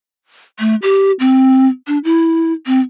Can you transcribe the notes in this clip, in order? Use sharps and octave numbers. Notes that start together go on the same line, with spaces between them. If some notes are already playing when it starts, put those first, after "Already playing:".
A3
G4
C4
D4
E4
C4